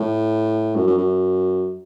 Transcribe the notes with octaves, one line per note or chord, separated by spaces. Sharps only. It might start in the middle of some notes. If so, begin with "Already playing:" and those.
Already playing: A2
F#2
F#2
F#2